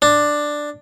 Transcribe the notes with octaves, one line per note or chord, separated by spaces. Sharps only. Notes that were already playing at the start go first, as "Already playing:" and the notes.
D4